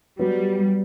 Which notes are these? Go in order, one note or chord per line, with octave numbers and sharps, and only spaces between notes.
F#3 G3 B3 F#4